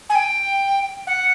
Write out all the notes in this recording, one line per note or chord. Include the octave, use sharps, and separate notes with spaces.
G#5
G5
F#5